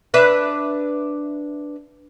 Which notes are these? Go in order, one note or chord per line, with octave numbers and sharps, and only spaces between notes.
D4 B4 E5